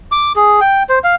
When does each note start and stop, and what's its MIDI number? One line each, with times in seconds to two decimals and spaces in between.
0.12 0.33 86
0.36 0.60 68
0.61 0.83 79
0.89 0.99 72
1.04 1.15 77